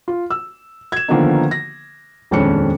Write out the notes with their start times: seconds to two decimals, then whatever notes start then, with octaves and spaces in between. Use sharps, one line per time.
0.08 F4
0.30 E6
0.92 G#6 E7
1.08 D3 D#3 F3 A#3 B3 D#4
1.51 A#6
2.31 D#1 F2 G#3 C#4 D4 C#7